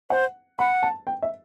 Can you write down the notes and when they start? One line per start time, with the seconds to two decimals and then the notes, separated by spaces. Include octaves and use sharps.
0.10 C5 F#5
0.59 F#5 B5
0.83 A5
1.07 G5
1.22 E5